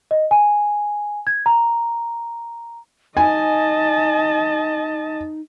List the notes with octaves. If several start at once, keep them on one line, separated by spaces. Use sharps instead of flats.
D#5
G#5
G#6
A#5
D#4 D#5 G#5 A5